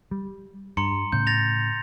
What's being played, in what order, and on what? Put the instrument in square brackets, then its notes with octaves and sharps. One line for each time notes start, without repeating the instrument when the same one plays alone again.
[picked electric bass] G3
[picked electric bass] G2 [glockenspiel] A#5 C6 C#7
[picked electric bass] A2 C#3 [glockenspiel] G6
[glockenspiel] A6 A#6 F7